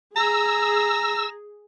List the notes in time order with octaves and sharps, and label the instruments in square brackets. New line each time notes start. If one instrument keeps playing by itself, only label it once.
[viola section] G#4 [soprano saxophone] A#5 [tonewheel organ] E6